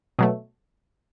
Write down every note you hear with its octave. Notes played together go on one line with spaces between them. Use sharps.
B2 F#3 A3